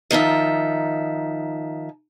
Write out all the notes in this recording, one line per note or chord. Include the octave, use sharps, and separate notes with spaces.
D#3 F3 D#4 E5